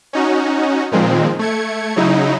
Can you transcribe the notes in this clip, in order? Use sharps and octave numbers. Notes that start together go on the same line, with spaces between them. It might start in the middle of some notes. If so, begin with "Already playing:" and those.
C#4 D#4 F#4
A#2 D#3 F3 G#3 C4
A3 G#6 C#7
C#3 F#3 D#4 E4